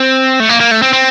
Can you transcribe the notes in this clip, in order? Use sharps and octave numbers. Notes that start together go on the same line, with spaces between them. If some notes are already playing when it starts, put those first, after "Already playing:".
Already playing: C4
A3
A#3
A#3
A3
C4
C4